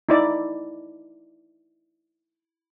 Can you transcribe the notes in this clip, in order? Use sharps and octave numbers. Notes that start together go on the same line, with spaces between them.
D#4 E4 D5